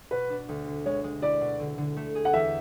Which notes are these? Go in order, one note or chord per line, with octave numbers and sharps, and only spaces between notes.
B2 B4
D4
D2
D3
G#3 C#5
G#3
E4 D5
B2
D3
D3
A3
G#4
F#5
E2 E5